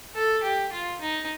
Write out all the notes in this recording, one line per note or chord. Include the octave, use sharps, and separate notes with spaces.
A4
G4
F4
D#4